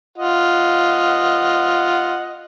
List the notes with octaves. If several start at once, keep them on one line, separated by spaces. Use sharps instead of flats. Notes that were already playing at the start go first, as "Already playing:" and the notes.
F4 D#5 F#5